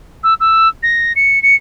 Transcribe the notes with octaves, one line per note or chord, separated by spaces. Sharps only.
E6
E6
A#6
C#7
C#7